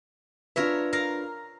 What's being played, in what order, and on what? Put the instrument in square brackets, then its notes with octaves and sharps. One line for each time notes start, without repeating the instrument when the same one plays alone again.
[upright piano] D4 F4 B4 [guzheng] A#4 C#5 E5
[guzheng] A#4 F5 A#5